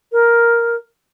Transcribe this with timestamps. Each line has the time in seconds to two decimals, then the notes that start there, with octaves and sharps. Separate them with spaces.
0.12 A#4